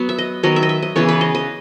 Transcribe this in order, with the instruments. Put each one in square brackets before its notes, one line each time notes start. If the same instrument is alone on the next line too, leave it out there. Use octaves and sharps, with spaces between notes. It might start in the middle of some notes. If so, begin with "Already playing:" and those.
Already playing: [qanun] F#3 B3
E5
D#5
D#3 F#3 B3 D#5
E5
D#5
E5
D#5
C#3 E3 B3 C#5
B4
D#5
D#5